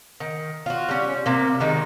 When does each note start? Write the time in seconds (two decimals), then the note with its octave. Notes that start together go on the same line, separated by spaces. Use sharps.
0.20 D#3
0.66 F4 F#4
0.88 G3 C#4
1.26 C3 A#3
1.60 D#3 G#3 A#3 D#4